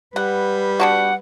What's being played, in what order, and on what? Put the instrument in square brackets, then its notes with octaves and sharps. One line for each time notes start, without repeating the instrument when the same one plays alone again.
[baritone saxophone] G3 [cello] B4 [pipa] F#5
[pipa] B3 D4 F#4 [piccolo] F#5